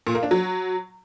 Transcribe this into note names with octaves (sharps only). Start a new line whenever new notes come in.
A#2
A#3
D4
F#3